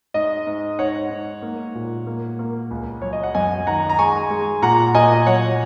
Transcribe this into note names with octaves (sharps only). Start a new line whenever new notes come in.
G#2 D#5
G#2
G#2 C#5 F#5
G#2
A#3
A#2
A#3
A#3
C#2
F#3 C#5
D#5
F#5
F#2 D#5 G#5
D#3 F#5 A#5
A#5
G#3 G#5 C#6
G#3
A#2 F#5 A#5
A#2 D#5 G#5
F#3 C#5 F#5